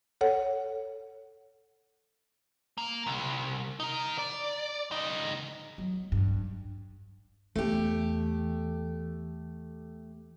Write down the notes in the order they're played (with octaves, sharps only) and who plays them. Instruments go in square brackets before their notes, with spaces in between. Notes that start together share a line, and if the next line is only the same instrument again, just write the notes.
[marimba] A4 C#5 F#5
[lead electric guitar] A#3
C2
D#4 A#4
D5
C#2 D#4
[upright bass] F#3
G2
[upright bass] E2 [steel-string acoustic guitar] A3 G4